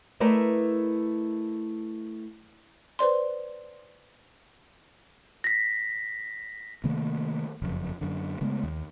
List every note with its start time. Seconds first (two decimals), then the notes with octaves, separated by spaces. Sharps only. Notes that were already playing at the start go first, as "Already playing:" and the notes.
0.20 A3 E4 A#4 B4 D5 D#5
2.99 B4 C5 D5 C6
5.44 A#6 B6
6.84 C3 D#3 A3 A#3
7.62 F#1 F2
8.01 F#2 D3
8.41 C#3 G#3 A3 B3
8.63 D#2